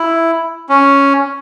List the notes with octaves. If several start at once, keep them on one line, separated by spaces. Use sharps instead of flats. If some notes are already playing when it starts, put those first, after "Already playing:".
Already playing: E4
C#4